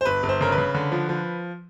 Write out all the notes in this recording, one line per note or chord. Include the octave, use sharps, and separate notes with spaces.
C5
G1 B4
G1
C5
C#3 A#4
B4
C#3
D3
F3
F3